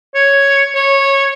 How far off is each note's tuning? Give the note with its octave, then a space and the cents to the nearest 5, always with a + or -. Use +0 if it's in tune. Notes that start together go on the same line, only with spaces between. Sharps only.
C#5 +0
C#5 -15